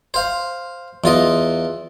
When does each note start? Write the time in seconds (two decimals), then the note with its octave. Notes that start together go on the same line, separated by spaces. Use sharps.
0.14 C5 F5
1.04 E2 F4 D#5